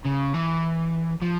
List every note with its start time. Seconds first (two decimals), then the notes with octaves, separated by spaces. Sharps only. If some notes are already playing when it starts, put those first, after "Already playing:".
0.05 C#3
0.34 E3
1.22 F3